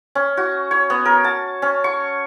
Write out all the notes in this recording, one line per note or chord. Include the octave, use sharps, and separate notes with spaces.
C#4
F#4
C#5
B3
A#4
A5
C#4
C#6